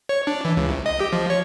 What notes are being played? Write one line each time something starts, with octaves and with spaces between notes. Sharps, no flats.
C#5
D4
E3
C#2
C2
D#5
G4
F3
C#5